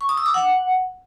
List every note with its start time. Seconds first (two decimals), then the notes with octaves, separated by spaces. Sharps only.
0.01 C#6
0.09 D#6
0.17 E6
0.26 D6
0.34 F#5